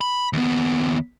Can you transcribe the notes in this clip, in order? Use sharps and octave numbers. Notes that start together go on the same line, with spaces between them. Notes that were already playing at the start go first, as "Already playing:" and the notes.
B5
D#2 B3